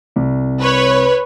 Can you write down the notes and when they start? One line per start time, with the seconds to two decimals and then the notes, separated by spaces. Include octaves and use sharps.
0.16 C2
0.61 B4 C#5